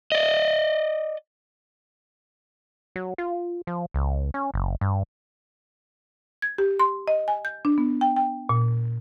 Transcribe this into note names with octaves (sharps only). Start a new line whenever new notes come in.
D5 D#5
F#3
F4
F3
C#2
C#4
F#1
G2
G#6
G4
C6
D#5
G#5
G6
D4
B3
G5
G5
A#2